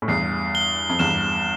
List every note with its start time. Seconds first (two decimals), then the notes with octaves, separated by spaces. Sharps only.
0.02 A2
0.08 E2 G2 C7
0.55 G7
0.89 F2
0.99 E2 G2 E7